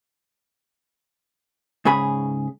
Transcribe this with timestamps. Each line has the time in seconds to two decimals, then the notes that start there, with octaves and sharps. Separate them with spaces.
1.85 G#2 C#3 G#4 B5